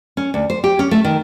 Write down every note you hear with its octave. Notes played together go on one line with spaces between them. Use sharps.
C#4
D2
C5
G4
C#4
A3
D#3